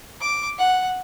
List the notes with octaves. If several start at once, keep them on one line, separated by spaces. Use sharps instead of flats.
D6
F#5